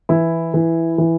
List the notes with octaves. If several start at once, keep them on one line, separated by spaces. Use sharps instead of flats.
E3 E4
E3
E3